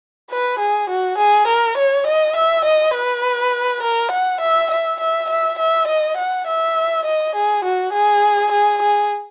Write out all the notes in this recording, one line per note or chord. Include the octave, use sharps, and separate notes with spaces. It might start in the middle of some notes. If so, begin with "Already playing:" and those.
B4
G#4
F#4
G#4
A#4
C#5
D#5
E5
D#5
B4
A#4
F#5
E5
E5
E5
E5
E5
D#5
F#5
E5
D#5
G#4
F#4
G#4
G#4
G#4